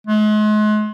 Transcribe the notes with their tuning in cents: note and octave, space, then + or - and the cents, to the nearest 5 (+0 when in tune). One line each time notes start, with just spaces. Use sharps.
G#3 +40